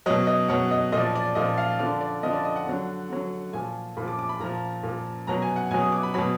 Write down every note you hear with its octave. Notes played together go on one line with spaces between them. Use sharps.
B2 F#3 D#5
D#5
B2 F#3 F#5
D#5
A#2 F3 D5 D#5
D5
A#2 F3 D#5
F5
D3 F3 D5
D5
D3 F3 D#5
D5
D#5
F#5
D3 F#3
D3 F#3
A#2 F3 G#5
A#2 F3 B5
D6
D6
B5
A#2 F3 A#5
A#2 F3
B2 F#3 A#5
G#5
F#5
B2 F#3 G#5
D#6
D6
B5
B2 F#3 B5